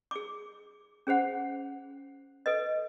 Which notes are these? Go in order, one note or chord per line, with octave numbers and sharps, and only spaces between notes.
G#4 D6
C#4 G#4 C5 F#5
A4 B4 D#5